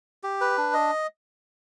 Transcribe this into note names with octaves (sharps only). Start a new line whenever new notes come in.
G4
B4
D4
D#5